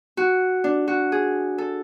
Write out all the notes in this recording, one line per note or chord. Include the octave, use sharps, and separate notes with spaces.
F#4
D4
F#4
G#4
A4